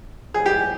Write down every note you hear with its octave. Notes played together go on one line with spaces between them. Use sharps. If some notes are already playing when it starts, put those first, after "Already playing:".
G#4
G4